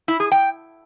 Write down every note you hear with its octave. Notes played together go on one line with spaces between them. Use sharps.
E4
G#4
G5